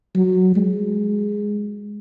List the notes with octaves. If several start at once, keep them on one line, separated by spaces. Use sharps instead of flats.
F#3
G#3